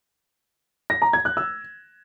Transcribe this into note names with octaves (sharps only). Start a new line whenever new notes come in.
A#6
A#5
G#6
F#6
E6